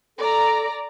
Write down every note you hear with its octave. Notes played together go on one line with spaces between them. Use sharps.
A4 D5 A#5